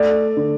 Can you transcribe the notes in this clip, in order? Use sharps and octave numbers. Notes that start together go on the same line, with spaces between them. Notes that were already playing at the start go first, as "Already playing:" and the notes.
Already playing: A3 D5
D3